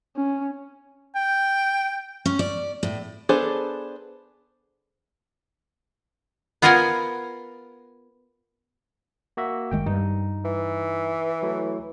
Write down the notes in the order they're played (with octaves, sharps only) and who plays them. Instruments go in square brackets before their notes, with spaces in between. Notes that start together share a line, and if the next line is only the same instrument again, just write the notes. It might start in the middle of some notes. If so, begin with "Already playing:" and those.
[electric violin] C#4
[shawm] G5
[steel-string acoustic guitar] C#4
D5
A2
[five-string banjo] B3 D4 G#4 A4 C5
[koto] B3 F4 A#4 D#5 F#5 G#5
[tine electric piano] A#3 F#4 E5
[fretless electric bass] F#1 D#3 G#3 [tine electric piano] G5
[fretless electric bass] G2 [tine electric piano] D#4
[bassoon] E3
[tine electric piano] F#3 A3 E4